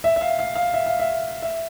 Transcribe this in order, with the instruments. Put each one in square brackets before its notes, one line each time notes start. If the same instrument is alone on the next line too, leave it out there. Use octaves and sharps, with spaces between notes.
[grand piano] E5
E5
F5
F5
F5
E5
F5
E5
E5